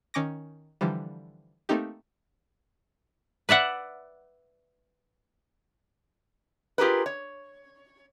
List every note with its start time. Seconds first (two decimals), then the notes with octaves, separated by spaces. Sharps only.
0.14 D#3 C#4 D6 A#6
0.81 D3 E3 F3 G3
1.69 A3 A#3 C4 D#4 G4
3.49 B4 D5 E5 F#5
6.78 F4 G4 G#4 A#4 B4
7.06 C#5